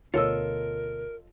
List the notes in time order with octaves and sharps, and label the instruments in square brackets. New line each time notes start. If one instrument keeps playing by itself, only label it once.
[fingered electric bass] D2 B2 [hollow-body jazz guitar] F4 A4 D#5 [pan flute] A#4 [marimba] C#5 E6